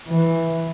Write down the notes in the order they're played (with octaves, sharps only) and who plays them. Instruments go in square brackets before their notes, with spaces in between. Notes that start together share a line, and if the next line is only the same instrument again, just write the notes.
[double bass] E3